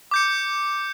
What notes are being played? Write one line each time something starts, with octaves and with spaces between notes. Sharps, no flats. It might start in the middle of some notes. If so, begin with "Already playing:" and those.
D6 G6 C#7